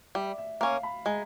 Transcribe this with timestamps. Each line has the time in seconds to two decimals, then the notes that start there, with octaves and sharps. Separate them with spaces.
0.15 G3 E5
0.38 E5
0.61 A#3 C#4 F5
0.83 B5
1.06 G#3 A#5